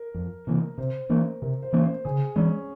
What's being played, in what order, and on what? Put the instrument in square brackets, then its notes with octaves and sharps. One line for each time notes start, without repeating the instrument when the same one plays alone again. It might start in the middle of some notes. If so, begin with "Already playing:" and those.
Already playing: [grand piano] A#4
[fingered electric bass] F2
C3 E3 A#3
[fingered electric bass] C3 [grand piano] C5
[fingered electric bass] E3 A#3 C#4 [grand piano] A#4
[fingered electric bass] C3 [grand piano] A#4
[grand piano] C5
[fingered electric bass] E3 A#3 C#4
[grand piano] C5
[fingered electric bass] C#3 [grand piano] G#4
[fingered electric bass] E3 G#3 [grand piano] C#4